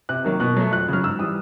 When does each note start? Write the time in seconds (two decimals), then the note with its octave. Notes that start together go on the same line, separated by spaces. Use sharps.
0.09 C3 F#6
0.25 D#3 F#3 A#3
0.40 B2 F#6
0.56 F#3 A3
0.72 F2 F#6
0.88 C#3 F#3 F6
1.04 G#2 E6
1.19 E3 G3 D#6